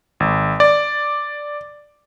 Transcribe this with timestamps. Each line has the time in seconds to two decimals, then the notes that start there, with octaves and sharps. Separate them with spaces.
0.20 G#1
0.60 D5